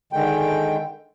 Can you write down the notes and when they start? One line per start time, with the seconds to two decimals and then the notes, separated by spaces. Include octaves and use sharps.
0.13 D3 D#3 G#3 G5